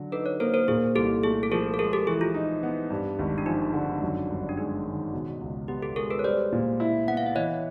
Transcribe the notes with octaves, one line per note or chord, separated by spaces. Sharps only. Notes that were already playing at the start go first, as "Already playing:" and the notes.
Already playing: D3 F#3
D#4 A4 B4
B4 C#5
A#3 A#4 C5
A#4 C5
A#2 G#4 A#4
C2 G4 A4
A3 G#4
A4
F3 G#4 A#4
A4
G#3 G#4 A#4
G4 A4
E3 G#4
F4
D#4
B3
G2
G#1
D4
F3 D#4
D3
F#2
G1
D4
G#3 D#4
D#3
B2
C#2
B3 G4
G4 A4
G#3 G#4 A#4
A4 B4
C#5
G3 C5 D5
A#2
E4
B3 F#5
F5
E5
E3 C#5 D#5